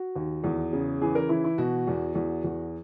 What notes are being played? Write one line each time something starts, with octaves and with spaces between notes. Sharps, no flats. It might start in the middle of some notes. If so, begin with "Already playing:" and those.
Already playing: F#4
D#2
E2
C#3
E3 G#4
A#4
E3 E4
E4
B2 F#4
E2
E2
E2